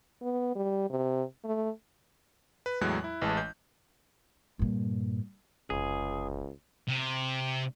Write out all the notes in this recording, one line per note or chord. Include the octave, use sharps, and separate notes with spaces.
B3
G3
C3
A3
B4
E2 A2 F#3 G#3 F#6
E4
A1 E3 G#3 A5
G6
G2 A#2
F1 C#2 G#4
C3